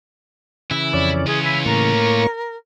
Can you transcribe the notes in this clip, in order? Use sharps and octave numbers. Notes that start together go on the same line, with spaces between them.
C#3 E3 E4 E5
F2 C#4 D5
C#4 F4 G#4
E4 G#5
A2 A#3 A#4 C#6